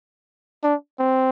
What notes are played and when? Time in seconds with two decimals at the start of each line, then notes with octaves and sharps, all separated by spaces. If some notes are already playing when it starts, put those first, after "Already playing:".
0.64 D4
0.99 C4